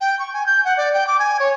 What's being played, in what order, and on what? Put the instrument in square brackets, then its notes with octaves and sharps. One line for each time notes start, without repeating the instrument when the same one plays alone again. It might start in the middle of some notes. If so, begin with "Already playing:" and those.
[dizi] G5
C#6
G#5
G6
F#5
D5
G5
D6
G#5
C#5